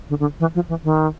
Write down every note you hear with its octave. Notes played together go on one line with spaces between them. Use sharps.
D3
D3
E3
F3
E3
D#3